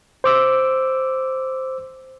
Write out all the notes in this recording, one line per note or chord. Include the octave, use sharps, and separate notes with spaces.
C5 D6 E6